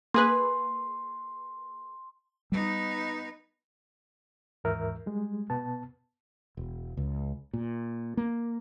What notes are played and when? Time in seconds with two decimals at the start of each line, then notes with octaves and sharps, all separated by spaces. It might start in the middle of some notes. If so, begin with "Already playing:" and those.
0.14 A#3 G#4 B4 C6
2.52 G3 B3 D#4
4.64 D#2 G#2 E3 A#4 E5
5.06 G3 G#3
5.50 B2 B3 A5
6.57 E1
6.97 C#2
7.53 A#2
8.17 A#3